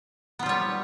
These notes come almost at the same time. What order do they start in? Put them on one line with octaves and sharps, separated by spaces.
B3 F4 G3 C#5